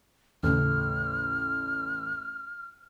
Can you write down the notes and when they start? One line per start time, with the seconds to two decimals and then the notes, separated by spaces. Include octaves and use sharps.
0.43 A1 D#2 C#3 A3 F6